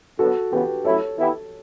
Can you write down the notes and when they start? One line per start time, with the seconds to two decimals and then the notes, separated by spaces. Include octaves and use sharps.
0.19 D3 F#3 B3 F#4 A4
0.52 C#3 E3 B3 G4 B4
0.84 A2 F#3 C#4 E4 A4 C#5
1.17 E3 B3 E4 G4